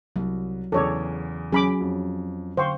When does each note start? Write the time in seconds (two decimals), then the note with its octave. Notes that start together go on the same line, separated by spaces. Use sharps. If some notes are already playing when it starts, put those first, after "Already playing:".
0.16 C2 F#3
0.72 E2 C#3 A4 C#5 D5
1.52 F#3 C#4 G#4 B5 D6
1.81 F2
2.57 D3 C5 F5 G5 C#6